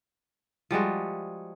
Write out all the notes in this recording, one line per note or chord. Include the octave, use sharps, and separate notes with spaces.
F3 G3 G#3 F#4